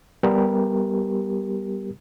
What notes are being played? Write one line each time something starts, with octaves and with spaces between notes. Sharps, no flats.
G3 B3 G4 A#4